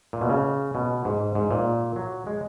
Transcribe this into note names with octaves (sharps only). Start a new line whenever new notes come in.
A#2
B2
C#3
B2
G#2
G#2
A#2
F#3
G#3